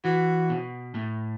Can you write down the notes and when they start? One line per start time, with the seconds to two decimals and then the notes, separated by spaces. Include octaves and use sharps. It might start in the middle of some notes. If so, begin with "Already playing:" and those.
0.05 E3 F#4
0.50 B2
0.95 A2